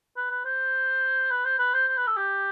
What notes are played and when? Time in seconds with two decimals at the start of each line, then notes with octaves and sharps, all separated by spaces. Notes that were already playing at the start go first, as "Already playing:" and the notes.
0.16 B4
0.30 B4
0.44 C5
1.31 B4
1.45 C5
1.58 B4
1.74 C5
1.87 C5
1.97 B4
2.07 A4
2.16 G4